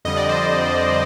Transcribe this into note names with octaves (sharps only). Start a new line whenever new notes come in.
F2 D3 G3 D#5
D5
C5
D3 G3